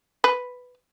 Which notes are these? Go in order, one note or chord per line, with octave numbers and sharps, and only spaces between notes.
B4